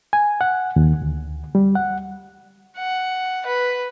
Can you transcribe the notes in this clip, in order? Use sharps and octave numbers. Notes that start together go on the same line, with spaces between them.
G#5
F#5
D#2
D2
G3
F#5
F#5
B4